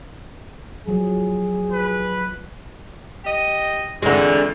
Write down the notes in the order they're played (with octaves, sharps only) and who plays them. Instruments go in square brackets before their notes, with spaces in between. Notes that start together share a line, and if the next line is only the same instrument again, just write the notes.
[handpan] F3 F#3 [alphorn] G#4
[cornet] B4
[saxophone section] G4 D#5
[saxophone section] F2 E3 [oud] D3 G#3